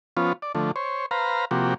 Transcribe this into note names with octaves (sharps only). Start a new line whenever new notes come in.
F3 B3 C#4 F4
D5
D3 F3 A3
C5 C#5
B4 C5 F5 A#5
C3 F3 A#3 F#4 G4